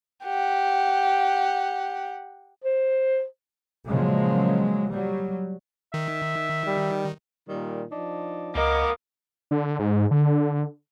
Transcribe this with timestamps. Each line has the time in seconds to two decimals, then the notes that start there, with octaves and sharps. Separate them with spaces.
0.24 G4 F#5
2.63 C5
3.86 A#2 C#3 F3 F#3 G#3 A#3
4.91 F#3 G3
5.94 D#3 E5
6.67 G3
7.49 A#2 D#3 G3
7.92 F3 D4 D#4
8.55 C#2 A#3 B3 A#4 D#5 D6
9.51 D3
9.79 G#2
10.11 D3